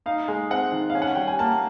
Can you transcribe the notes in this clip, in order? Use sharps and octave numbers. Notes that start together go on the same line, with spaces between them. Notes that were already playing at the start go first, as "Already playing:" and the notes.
D#4 F5
G#3
C4 F#5
D#3
F5
C#4
F#5
G3 G5
G#5
A#3 A5